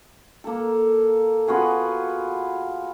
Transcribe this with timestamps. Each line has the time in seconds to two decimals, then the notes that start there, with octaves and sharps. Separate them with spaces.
0.44 A#3 A4
1.48 B3 F4 F#4 G#4